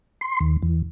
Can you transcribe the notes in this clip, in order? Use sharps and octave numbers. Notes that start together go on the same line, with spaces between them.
C6
D#2
E2